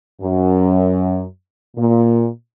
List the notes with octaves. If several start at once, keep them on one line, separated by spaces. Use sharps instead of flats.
F#2
A#2